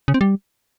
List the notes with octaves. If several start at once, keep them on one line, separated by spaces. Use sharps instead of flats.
C#3
C4
G3